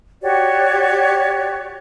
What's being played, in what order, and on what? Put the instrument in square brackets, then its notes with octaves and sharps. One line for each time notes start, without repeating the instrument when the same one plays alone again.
[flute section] F#4 G4 C#5 D5